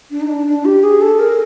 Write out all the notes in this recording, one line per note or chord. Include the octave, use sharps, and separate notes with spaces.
D4
D#4
D4
D4
G4
G#4
A4
A#4